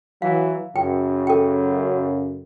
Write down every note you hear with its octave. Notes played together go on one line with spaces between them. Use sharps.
E3 F#3 F5
F#2 C#3 G5
A4 G5